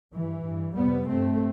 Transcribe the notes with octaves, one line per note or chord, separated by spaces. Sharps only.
G2 E3
G2
F2 C3 G3 B3
G2 A3 C4